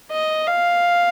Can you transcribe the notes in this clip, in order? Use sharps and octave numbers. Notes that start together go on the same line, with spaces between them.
D#5
F5